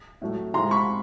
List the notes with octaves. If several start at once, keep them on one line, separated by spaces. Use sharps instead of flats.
A2 F#3 A3
A2 F3 G#3 A#5 C6
B5 C#6